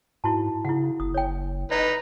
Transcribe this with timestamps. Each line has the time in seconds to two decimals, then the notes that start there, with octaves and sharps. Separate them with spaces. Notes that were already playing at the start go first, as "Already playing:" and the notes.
0.24 G#2 E4 F#4 A5
0.65 C#3 E4 F#5
1.00 F#1 D#6
1.14 C#5 G5
1.71 D#4 B4 D5 D#5